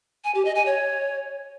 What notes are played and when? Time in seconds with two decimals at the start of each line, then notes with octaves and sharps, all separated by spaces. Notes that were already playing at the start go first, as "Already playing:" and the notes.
0.24 G#5
0.35 G4
0.45 D#5
0.55 G#5
0.66 C#5